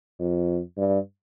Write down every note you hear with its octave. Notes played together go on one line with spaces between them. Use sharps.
F2
G2